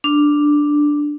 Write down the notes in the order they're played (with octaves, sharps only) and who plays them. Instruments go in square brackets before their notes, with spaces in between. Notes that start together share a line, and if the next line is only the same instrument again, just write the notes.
[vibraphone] D4